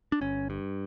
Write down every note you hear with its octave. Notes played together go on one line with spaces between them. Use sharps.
D4
G1 C#4
G2